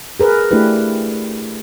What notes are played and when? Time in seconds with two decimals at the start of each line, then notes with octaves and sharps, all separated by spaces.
0.20 G#4 A#4 B4
0.51 A3 D4 E4 G4 B4